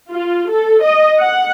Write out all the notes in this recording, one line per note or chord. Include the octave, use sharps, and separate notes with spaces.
F4
A4
D#5
F#5